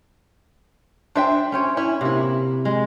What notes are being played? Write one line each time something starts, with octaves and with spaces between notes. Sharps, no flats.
D4 C5 E5 G5
C#4 C5 C#5
C#4 E4
C3 A#3 E4
G#3